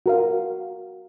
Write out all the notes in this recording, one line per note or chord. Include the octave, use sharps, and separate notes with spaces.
F#4 A#4 F5